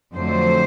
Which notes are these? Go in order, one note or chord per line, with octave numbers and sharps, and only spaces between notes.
F2 D3 F#3 A3 C5